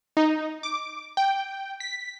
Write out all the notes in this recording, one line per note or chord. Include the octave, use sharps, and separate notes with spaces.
D#4
D6
G5
B6